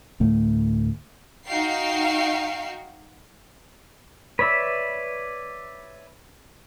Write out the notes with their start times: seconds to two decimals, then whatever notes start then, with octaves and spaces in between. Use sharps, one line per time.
0.20 D2 A2 A3
1.48 D#4 F#4 F5 G5 C#6 C7
4.39 B4 C#5 D5 E5